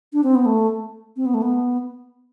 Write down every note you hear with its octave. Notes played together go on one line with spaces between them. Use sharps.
D4
C4
B3
A3
C4
B3
A3
B3